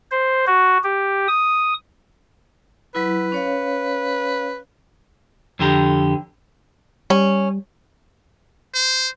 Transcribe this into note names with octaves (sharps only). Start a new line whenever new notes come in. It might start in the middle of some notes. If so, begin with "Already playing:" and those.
C5
F#4
G4
D#6
F#3 E4 B4
C#4 C#5 F5
F2 D3 G4 A#5
G3 C#4
C5